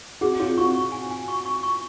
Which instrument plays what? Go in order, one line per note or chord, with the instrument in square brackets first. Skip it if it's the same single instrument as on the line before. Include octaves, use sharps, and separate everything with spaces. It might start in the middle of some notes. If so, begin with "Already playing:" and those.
[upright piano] F#4 [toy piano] G#4
[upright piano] F4 [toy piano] C#5
[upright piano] F#4 [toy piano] C#6
[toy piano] C#6
G#5
G#5
C#6
C#6
C#6